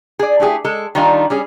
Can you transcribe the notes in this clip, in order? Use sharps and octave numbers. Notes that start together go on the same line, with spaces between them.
G#4 D5
A3 E4 G4 G#4
G#3 A4
D#3 G3 D4 D#4 F4
G3 C#4 G#4